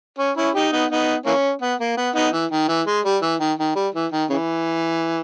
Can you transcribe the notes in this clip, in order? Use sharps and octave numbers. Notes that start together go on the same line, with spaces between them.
C#4
C#4 E4
D#4 G4
B3 D#4
B3 D#4
E3 A#3 C#4
B3
A#3
B3
B3 D#4
E3
D#3
E3
G#3
G3
E3
D#3
D#3
G3
E3
D#3
C#3 E3